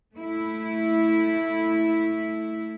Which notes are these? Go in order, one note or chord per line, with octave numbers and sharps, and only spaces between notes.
A3 E4